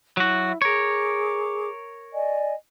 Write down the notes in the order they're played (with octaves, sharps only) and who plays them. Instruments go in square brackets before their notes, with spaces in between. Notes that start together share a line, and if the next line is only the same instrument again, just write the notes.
[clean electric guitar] F#3 F#4 [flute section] E4
[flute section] G#4 D6 [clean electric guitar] A#4 C#5
[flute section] D5 D#5 G#5